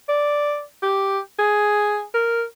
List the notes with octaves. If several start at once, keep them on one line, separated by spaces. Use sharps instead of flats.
D5
G4
G#4
A#4